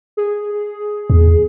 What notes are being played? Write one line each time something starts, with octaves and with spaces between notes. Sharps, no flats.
G#4
E2